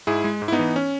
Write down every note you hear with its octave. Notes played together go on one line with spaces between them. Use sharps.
G#2 E4 G#4
G#3
G#2
E4
B3 D#4
E3
C#4